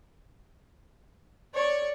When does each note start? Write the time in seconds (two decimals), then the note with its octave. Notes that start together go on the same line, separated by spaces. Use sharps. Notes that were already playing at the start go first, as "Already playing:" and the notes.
1.54 C#5 D5